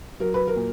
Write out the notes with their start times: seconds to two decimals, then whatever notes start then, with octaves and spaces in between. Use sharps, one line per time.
0.20 F#3 A#4
0.34 B4
0.47 A#4
0.56 A#2